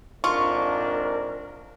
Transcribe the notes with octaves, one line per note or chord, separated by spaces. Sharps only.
F2 G#2 D4 F4 A#4 C#6